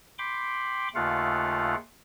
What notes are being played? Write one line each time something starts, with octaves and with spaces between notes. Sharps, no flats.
G5 B5 C6 D6
D#2 C#3 A3 F4 F5 F#5